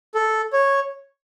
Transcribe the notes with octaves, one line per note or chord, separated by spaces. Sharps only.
A4
C#5